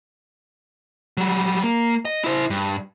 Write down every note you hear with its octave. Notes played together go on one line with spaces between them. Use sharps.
F#3 G3
A#3
D#5
E4 C5
G2